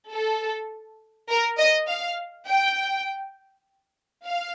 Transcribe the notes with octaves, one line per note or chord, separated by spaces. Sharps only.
A4
A#4
D#5
F5
G5
F5